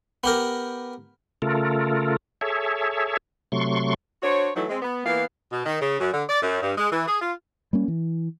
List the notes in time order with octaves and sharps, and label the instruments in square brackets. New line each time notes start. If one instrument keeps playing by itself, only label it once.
[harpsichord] B3 G4 A#4
[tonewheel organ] C#3 A3 F4 A4 A#4
G#4 A4 C#5 E5
C3 F#3 A3 C6 C#6
[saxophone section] D4 F#4 C5 C#5
E3 F#3 A3 D#4 E4
G#3 C4
B3
E3 A#3 B3 B4 F5
B2
D#3
C#3
F#2
D3
D5
F#2
G2
G#3
E3
G#4
F4
[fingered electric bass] G3 A#3 C#4
E3